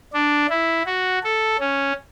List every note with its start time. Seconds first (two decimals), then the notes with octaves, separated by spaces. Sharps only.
0.13 D4
0.50 E4
0.86 F#4
1.24 A4
1.60 C#4